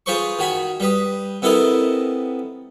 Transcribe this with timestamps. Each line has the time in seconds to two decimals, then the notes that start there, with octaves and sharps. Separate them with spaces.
0.06 F4 G#4 B4 C5 C6 C#6
0.39 D#3 F#4 G#5 B5
0.80 G3 B4 D#6
1.42 C3 B3 E4 A4 A#4 D#5